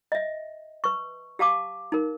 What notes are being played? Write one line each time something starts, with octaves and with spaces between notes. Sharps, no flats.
D#5 E5
B4 C#6
G4 F5 A5 D6
D#4 A#4